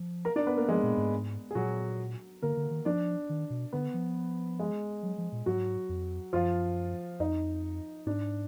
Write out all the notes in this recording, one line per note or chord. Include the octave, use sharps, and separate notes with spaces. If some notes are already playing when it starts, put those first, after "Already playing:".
Already playing: F3
A#4 A#5
D4 D5
B3 B4
A#3 A#4
F3 G#3 G#4
A#2
G#2
G#4
A#2 F#3 F#4
D3 A#3 A#4
D3
D#3
F3 D4 D5
D#3
B2
D3 B3 B4
F3
G#3 G#4
F#3
F3
A#2
G#2 F#3 F#4
F2
F#2 F3 F4
F2 D#4
G#2 D4